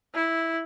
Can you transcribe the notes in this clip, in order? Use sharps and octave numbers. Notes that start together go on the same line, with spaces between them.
E4